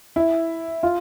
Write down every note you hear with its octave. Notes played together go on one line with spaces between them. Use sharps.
E4
F4